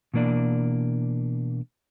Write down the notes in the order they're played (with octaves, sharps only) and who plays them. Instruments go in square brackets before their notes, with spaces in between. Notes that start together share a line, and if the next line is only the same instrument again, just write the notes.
[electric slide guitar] B2 E3 A#3 D4 D5